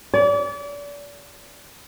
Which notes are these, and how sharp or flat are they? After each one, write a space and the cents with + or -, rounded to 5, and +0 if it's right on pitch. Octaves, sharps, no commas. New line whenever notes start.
D5 -35